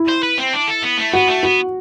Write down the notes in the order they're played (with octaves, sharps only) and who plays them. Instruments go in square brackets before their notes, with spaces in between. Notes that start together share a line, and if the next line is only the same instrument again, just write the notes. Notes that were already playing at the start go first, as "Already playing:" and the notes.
Already playing: [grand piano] E4
[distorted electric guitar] C5
B4
C4
D4
A4
B3
A3
[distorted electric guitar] B3 [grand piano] F#4
[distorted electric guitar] A3
[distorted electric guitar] B3 [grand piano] F#4